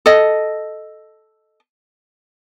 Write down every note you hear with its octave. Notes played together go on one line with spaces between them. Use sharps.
A4 D#5